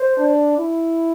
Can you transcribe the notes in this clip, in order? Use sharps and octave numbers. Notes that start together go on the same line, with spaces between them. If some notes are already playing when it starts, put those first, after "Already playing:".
Already playing: C5
D4
E4